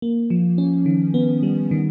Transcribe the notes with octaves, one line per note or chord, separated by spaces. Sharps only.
A#3
F3
C#4
D#3
B3
G3
D#3